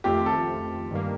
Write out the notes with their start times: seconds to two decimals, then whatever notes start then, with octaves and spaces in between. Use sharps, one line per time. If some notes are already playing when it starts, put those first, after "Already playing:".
0.04 F2 D#3 A3 C4 F4 G4
0.26 A4
0.90 G2 D#3 G3 A#3